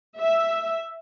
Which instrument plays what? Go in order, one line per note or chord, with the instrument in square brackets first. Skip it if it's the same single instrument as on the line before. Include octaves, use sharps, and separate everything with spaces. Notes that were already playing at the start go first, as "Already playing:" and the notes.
[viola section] E5